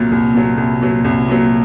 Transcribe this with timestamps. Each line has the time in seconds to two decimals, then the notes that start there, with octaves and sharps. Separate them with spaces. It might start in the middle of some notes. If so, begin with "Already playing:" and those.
Already playing: C2 A#2 F#3
0.12 C2
0.34 A#2 F#3
0.57 C2
0.81 A#2 F#3
1.05 C2
1.28 A#2 F#3